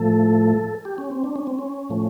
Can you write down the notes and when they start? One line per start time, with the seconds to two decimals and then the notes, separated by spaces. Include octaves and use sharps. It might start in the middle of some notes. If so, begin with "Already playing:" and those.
Already playing: A2 F3 A3 A4
0.85 G4
0.98 C#4
1.11 C4
1.24 D4
1.36 C#4
1.47 C4
1.59 C#4
1.89 A2 F3 A3